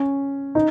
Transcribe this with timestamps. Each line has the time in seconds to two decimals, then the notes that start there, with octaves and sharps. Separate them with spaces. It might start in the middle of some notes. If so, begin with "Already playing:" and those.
Already playing: C#4
0.55 D#4